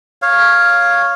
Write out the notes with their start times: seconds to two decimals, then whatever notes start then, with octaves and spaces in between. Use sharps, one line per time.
0.22 C#5 F5